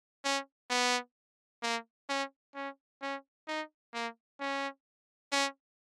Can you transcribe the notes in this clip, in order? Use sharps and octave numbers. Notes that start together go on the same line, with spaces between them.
C#4
B3
A#3
C#4
C#4
C#4
D#4
A#3
C#4
C#4